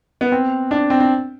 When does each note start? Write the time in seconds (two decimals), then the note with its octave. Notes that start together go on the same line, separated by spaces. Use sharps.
0.21 B3
0.32 C4
0.71 D4
0.90 C4
1.00 C4